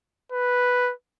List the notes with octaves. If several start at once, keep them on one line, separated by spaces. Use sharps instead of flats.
B4